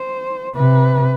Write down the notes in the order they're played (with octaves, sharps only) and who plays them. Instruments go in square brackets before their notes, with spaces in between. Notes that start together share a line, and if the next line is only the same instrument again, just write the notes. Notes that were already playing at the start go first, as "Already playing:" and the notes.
Already playing: [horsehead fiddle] C5
[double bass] C3 [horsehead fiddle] B4